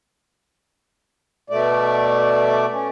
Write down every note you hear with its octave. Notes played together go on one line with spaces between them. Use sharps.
B2 A3 D5
C#4